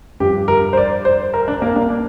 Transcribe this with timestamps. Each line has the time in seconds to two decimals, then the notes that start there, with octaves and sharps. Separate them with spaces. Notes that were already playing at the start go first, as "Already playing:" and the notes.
0.20 G2 F3 G4
0.48 A#4
0.73 C5
0.77 D5
1.05 C5
1.34 A#4
1.48 D4
1.62 A#3
1.76 A#3
1.90 D4